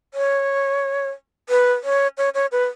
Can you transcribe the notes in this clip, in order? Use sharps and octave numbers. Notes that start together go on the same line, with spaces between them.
C#5
B4
C#5
C#5
C#5
B4